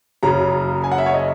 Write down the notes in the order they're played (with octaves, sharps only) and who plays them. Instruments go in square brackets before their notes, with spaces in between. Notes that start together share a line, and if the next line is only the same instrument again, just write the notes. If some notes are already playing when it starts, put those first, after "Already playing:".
[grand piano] F#1 F#2 C#3 A#5
G#5
F#5
E5
C#5
D#5